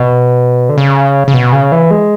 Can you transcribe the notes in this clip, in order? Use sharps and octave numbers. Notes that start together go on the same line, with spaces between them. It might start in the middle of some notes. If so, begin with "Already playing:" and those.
Already playing: B2
D3
C#3
C#3
B2
C#3
E3
G#3